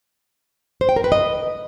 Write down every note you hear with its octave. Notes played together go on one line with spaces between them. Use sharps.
C5
G5
A#4
B4
D#5